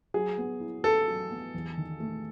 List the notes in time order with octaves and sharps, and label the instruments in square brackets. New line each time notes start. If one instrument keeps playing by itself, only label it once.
[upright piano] F#3 [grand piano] G#4
[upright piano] B3
E4
[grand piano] A4 [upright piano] B4
[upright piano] F#3
B3
E2
D#3
A3